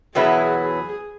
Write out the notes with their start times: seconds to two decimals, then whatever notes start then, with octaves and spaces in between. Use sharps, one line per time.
0.15 E2 B2 F#3 B3 E4 G#4
0.61 G#4